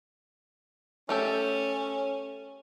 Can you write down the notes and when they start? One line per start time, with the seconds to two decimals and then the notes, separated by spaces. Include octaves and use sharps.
1.09 A3 C#4 G4 A4